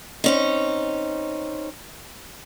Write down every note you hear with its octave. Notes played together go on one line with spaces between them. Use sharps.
C4 C#4 D#4